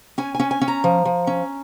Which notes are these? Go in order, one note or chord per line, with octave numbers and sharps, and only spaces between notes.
C#4 G#5
C#4 G#5
G#5
C#4
A#5
F3
F3
C#4